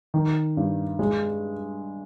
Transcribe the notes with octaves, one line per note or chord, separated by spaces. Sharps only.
D#3
G2
G#3